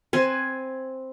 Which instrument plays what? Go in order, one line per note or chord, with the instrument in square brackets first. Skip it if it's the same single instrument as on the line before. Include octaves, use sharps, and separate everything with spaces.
[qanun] C4 B4 C5 G#5